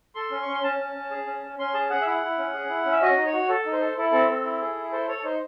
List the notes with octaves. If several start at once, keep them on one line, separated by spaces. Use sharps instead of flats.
A4 C6
C#4
C#6
C#4 C6
C#4 A5
C#4
C#4
G#4
C#4
C#4
C#4 C6
G#4 A5
G#4 F#5
E5
E4 F#5
E4
C#4
G#4
E4
C#4
E5
F#4 D#5
D#4
C#5
F#4
A4
D#4
C5
A4
E4 A4
C4 A4
C4
E4
G#4
E4
A4 C5
A4 C#5
A4
D#4 C5